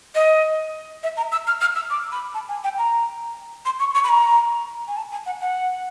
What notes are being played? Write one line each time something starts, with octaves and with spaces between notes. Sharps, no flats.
D#5
E5
A#5
E6
F6
F6
E6
D6
B5
A5
G#5
G5
A#5
C6
C#6
C#6
B5
A#5
G#5
A5
G#5
F#5
F#5